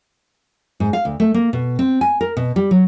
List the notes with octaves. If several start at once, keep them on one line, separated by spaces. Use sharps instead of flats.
G#2
F5
D2
A3
A#3
B2
C4
G#5
A#4
B2
G3
F#3